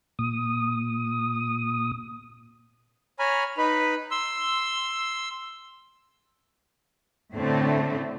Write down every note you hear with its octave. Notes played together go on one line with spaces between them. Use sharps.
A#2 D#6
C#5 G#5 A#5 B5 F6
D#4 B4 B5
C6 E6
A2 D3 A3 C4